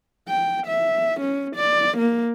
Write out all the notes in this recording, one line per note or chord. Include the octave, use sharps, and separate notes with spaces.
G5
E5
C#4
D5
A#3